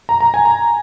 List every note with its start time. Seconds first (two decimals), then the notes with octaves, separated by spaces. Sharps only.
0.09 A#5
0.21 A#5
0.34 G#5
0.45 A#5